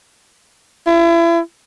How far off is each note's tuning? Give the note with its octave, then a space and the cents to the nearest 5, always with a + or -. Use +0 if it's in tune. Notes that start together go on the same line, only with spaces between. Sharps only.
E4 +35